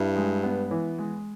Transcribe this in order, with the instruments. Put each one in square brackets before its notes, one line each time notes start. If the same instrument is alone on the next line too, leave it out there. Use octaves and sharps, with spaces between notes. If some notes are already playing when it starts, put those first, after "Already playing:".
Already playing: [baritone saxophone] G2 [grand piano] E4
[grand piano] G#3
B3
E3
G#3